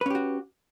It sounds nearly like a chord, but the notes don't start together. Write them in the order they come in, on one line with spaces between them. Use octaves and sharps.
B4 C#4 G4 F#4